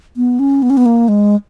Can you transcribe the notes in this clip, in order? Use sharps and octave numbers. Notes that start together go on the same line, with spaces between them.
B3
C#4
B3
C#4
B3
A#3
G#3